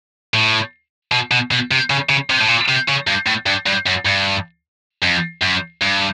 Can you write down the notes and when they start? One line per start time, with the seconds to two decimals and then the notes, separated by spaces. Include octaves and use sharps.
0.34 A2
1.12 B2
1.31 B2
1.51 B2
1.71 C3
1.90 C#3
2.09 C#3
2.30 C3
2.41 A2
2.48 A#2
2.68 C3
2.88 C#3
3.07 G2
3.26 A2
3.46 G2
3.66 G2
3.86 F#2
4.05 G2
5.02 F2
5.42 F#2
5.81 G2